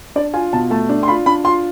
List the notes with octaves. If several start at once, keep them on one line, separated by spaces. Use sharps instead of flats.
D4 D5
F4 G#5
B2 A5
A3 A5
D4
C6
F4 B5
D4 B5
F4 C6